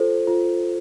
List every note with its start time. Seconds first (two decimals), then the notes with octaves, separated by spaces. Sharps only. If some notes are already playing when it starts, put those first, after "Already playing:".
Already playing: F4 A4 C5
0.27 F4